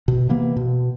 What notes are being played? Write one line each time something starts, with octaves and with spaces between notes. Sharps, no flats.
B2
C3 E3 A#3 B3
B2